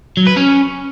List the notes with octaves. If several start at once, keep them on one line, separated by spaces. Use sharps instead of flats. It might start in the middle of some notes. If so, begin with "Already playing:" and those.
F#3
B4
C#4